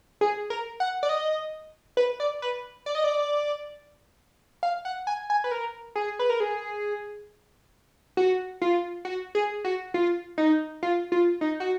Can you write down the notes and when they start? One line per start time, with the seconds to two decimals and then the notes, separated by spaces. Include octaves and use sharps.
0.21 G#4
0.50 A#4
0.80 F#5
1.03 D5
1.09 D#5
1.97 B4
2.20 D5
2.42 B4
2.86 D5
2.95 D#5
3.04 D5
4.63 F5
4.85 F#5
5.07 G#5
5.30 G#5
5.44 B4
5.51 A#4
5.96 G#4
6.19 B4
6.30 A#4
6.40 G#4
8.17 F#4
8.62 F4
9.05 F#4
9.35 G#4
9.64 F#4
9.94 F4
10.38 D#4
10.83 F4
11.12 F4
11.41 D#4
11.60 F#4